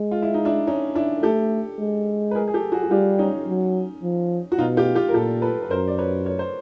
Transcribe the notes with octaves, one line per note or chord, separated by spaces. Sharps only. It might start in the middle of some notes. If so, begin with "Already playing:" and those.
Already playing: G#3
F4
E4
D#4
D4 E4
C#4 D#4
D4 E4
A3 G4 A4
G#3
B4
G#4 A#4
G#4
G4 A4
F#4 G#4
F#4
G3 F4 G4
C#4 D#4
F#3
F3
F#4
B2 D#4 F4
F4 G4
F4 G4
A#4
A#2 G4 A4
A4 B4
B4
F#2 A#4 C5
D5
B4 C#5
C#5
C5